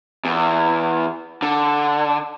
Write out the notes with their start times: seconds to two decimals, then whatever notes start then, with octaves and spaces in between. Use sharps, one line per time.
0.25 E2
1.42 D3